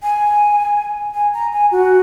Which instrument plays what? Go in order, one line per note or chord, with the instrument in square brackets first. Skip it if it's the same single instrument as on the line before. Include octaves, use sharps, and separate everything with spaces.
[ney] G#5
G#5
A#5
G#5
F#4